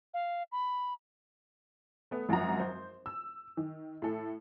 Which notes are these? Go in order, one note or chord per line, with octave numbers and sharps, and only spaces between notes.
F5
B5
A3 B3
G#1 F#2 F3 F#4 A#5
C5
E6
D#3
A2 A4